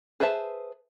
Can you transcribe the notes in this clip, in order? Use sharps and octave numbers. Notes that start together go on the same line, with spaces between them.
G#4 B4 C5 E5 A5